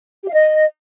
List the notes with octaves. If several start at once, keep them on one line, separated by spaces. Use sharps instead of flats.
G4
F5
D#5